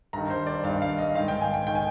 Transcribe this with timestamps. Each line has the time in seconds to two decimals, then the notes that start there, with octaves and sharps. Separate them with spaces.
0.13 G2 D#3 A#5
0.30 C5
0.47 D5
0.64 G2 D#3 F5
0.82 F5
0.98 D#5
1.15 D#3 F5
1.19 G#2
1.28 G5
1.41 G#5
1.54 G5
1.67 D#3 G5
1.75 G#5